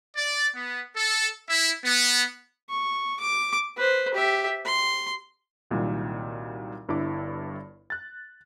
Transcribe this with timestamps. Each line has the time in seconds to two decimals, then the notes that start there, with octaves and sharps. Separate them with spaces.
0.17 D5
0.55 B3
0.97 A4
1.49 E4
1.85 B3
2.69 C#6
3.20 D6
3.77 B4 C5
4.14 G4 E5
4.65 C6
5.71 C2 A#2 D#3 F#3 G3
6.88 G1 G2 E4 D6
7.90 F#6 A6